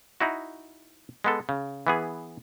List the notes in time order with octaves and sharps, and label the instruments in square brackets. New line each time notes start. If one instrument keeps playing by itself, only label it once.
[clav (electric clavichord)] D#4 E4 F#4
G#3 B3 A4
C#3
E3 B3 G#4